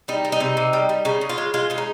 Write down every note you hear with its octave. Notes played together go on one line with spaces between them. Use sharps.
G3 D#4
G3
D#4
C3
C3
G3
G3
C#3 D#4
C#3
F4
G#3
G#3 F4
C#3 F4
D#4